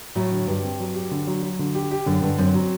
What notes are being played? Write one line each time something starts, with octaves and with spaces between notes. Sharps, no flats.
A2 F#3
D3
G2 G4
C4
F#3
G4
D3
F#3
F#3
D3
G4
G4
F#2 D3
G2 D3
F#2 C4
F#3